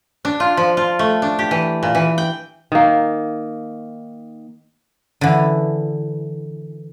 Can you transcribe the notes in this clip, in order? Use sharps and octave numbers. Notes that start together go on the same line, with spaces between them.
D4
F4
F3
F4
A3
D4
G4
E3
A#2
E3
G5
D#3 A#3
D3 E3